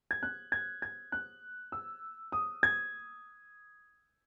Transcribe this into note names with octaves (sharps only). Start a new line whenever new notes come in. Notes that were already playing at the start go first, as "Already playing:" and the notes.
G#6
F#6
G#6
G#6
F#6
E6
D#6
G#6